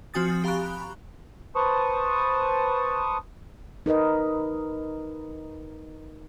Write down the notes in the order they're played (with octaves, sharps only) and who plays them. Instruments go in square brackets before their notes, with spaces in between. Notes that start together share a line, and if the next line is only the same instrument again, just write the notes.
[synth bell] F3 C4 F#4 G#5 D#6 A6
G4 F5 A#5 B5 C#6 F#6
[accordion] B4 C5 A5 C#6 D#6
[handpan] D#4 A#4 B4 D#5